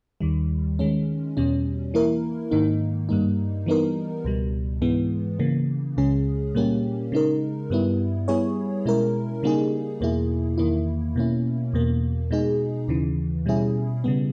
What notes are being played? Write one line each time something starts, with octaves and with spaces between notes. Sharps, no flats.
D#2 D#3 G3
D#3 G#3 C#4
E2 B2 G3 C#4
E3 A#3 E4 A#4
G#2 D#3 A#3 D#4
G2 G3 A#3 D#4
E3 G3 B3 D#4 A#4
C#2 B2 G3
G#2 E3 G#3 B3
C#3 E3 A#3
C#2 C#3 G#3 C#4 G#4
A#2 G3 A#3 C#4 G4
C#3 G#3 D#4 A#4
G2 G3 B3 E4
G3 B3 E4 G#4 C#5
B2 G#3 C#4 E4 A#4
C#3 G3 A#3 D#4 G#4
E2 B2 A#3 E4 G#4
E2 D#3 A#3 E4
B2 A#3 C#4 E4
E2 B2 A#3
B2 G#3 D#4 G#4
D#2 C#3 E3
B2 G3 C#4 E4 G#4
C#3 G3 B3